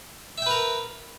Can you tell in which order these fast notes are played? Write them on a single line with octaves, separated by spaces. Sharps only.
E5 G5 B4 A#4